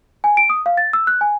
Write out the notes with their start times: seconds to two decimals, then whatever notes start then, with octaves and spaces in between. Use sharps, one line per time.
0.24 G#5
0.37 D7
0.50 D#6
0.66 F5
0.77 A6
0.93 E6
1.07 F#6
1.21 G#5